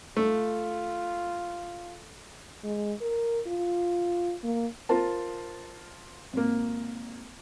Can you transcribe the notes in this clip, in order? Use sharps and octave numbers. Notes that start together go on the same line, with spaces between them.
A3 F4
G#3
A#4
F4
A#3
F4 A#4 C5 A5
G#1 A#3